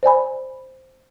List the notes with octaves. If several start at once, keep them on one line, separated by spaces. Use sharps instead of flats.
C5 D5 G#5 B5